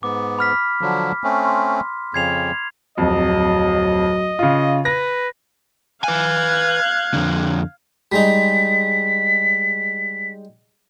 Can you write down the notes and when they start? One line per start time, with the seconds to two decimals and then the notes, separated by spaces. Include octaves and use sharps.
0.03 G#2 B3 D6
0.39 B5 F6 B6
0.81 D3 F3 F#3
1.24 A3 C4 C#4
1.46 C6
2.14 F2 C#3 G#6 C7 F7
2.98 D1 F2 F#3 D#5
4.39 C#3 F4
4.85 B4 A#6
6.04 B4 F5 G#5 F#6 G#6
7.14 F2 D3
8.12 G3 G#3 D#4 B6